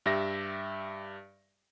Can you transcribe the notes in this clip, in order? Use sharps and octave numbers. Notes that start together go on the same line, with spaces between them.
G2 G4 E5 A#6